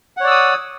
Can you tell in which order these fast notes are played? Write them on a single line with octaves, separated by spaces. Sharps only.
F#5 C#5 D5 E6 D#6